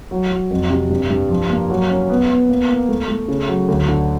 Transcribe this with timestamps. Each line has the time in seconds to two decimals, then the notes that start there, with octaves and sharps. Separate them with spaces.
0.11 F#3
0.31 F#3
0.51 F2
0.70 C3
0.90 G2
1.10 G2
1.30 F3
1.50 A#3
1.70 F#3
1.90 C#4
2.10 B3
2.29 B3
2.49 A#3
2.69 A#3
2.89 A3
3.08 A3
3.28 C#3
3.48 F#3
3.68 D2
3.88 D3